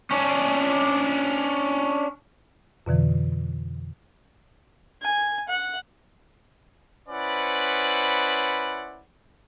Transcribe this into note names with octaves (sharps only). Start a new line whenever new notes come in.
C#4 D4
F2 B2 D3 E3
G#5
F#5
C#4 E4 B4 C5 D5 F#5